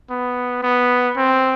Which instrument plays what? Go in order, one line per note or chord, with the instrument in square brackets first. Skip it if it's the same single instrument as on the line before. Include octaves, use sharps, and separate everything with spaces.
[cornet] B3
B3
C4